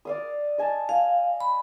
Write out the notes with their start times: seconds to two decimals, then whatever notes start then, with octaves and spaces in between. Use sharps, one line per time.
0.05 D5 F5 D#6
0.58 D#5 G#5 A5
0.89 F5 G#5
1.40 B5